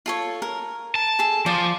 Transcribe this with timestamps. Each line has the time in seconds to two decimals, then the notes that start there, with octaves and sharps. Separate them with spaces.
0.06 F4 A4 C#5
0.42 A#4
0.95 A5
1.19 G#4 A4
1.46 F3 D5